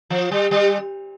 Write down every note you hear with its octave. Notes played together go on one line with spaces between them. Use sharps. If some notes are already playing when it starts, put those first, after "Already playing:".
F3
G3
G3